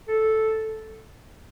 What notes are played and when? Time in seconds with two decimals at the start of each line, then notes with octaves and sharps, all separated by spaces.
0.08 A4